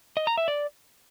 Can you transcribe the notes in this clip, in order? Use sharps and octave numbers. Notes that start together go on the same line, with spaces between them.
D#5
A#5
E5
D5